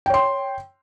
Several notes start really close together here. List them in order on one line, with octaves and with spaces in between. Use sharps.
G5 C#5 C6